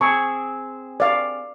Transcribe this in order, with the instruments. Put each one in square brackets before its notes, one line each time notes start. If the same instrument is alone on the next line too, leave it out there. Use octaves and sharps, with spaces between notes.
[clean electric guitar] C4 G#4 [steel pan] C#6
[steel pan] D5 F5